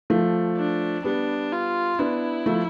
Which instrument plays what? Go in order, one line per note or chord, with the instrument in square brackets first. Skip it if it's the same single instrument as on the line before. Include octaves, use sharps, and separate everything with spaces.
[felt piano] F3 A3
[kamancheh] D4
[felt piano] G3 B3 [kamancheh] D4
[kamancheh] F4
[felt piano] B3 D4 [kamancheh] E4
[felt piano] F3 A3